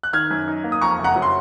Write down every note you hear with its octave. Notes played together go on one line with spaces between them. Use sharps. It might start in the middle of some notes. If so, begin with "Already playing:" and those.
F#6
D#3 F6 G#6
F#2
D#4
A#3
D#6
F2 A#5 C#6
F#1
F#5 A#5
F#3
C6